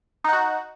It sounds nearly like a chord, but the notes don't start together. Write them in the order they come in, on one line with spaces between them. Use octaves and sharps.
D#4 F#5 F#4